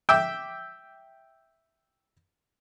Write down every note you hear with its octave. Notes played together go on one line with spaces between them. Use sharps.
E5 G5 D6 E6